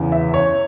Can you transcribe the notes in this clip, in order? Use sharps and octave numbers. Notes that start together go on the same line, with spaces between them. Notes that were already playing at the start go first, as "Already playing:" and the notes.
Already playing: E2 C#3 E3
E5
C#5